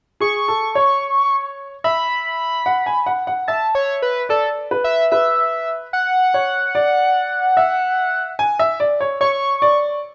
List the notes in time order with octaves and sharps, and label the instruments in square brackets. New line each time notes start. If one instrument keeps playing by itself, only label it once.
[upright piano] G#4 [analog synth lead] C#6
[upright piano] A4
C#5
[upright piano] E5 [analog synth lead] B5
[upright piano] F#5
G#5
F#5
F#5
[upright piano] E5 [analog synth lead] A5
[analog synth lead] C#5
B4
[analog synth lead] A4 [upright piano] D5
[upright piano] B4
[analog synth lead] E5
[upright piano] B4 [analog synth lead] E5
[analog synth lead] F#5
[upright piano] C#5
D5
E5
G#5
E5
D5
C#5
[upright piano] C#5 [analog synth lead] C#6
[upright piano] D5